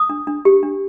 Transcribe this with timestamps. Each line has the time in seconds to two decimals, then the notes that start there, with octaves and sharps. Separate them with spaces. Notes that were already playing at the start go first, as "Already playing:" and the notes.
Already playing: D#6
0.09 D4
0.27 D4
0.45 G4
0.63 D4